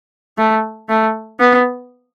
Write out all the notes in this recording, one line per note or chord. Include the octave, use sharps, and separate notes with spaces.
A3
A3
B3